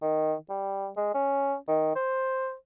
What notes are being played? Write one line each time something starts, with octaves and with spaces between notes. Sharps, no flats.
D#3
G3
G#3
C#4
D#3
C5